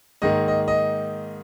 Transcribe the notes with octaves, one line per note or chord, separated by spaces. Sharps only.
G#2 D#3 A#3 D#5
D#5
D#5